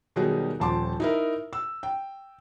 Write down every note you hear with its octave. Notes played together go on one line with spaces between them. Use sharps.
B2 D#3 F#3 G3 D#4 G#4
D#1 F3 A5 C6 D6
D#4 E4 A#4
E6
G5